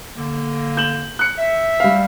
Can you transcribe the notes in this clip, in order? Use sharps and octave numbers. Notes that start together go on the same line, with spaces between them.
D3 A#3
G6 E7 F#7
F#6 C#7
E5
G3 F5